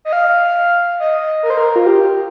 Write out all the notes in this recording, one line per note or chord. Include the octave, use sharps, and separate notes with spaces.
D#5
F5
D#5
A#4
C5
A#4
F4
G4